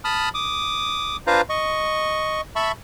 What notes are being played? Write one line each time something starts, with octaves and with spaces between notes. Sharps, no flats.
A5 B5 D#6 F6
D6 D#6
D4 F4 B4 C5 F5 A#5
D#5 C#6
E5 A5 B5 C#6